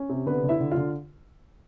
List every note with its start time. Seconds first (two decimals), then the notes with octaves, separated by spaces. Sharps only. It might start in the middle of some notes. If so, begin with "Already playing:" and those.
Already playing: C#4
0.09 C3
0.26 D3 B3 B4
0.43 D3
0.49 E4 E5
0.60 D3
0.71 F4 F5
0.77 D3